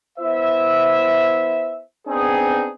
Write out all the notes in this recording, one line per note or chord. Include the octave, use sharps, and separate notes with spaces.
B3 E4 C5 E5
B3 C4 D4 D#4 G#4